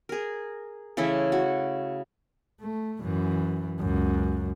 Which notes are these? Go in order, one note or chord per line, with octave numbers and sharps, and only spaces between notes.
G#4 A#4
C#3 E3 A3 E4
F#4
A3
F#2 E3
C#2 F#2